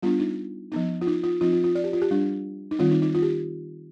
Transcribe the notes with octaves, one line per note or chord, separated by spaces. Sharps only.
G3 B3 D4 F4
D#4
F3 B3 D#4
F4
D#4
F4
F3 C4 D#4 F4
F4
F4
D5
G4
F4
G4
G3 D4
D#4
D#3 G3 C4 F4
D#4
D#4
F4
G4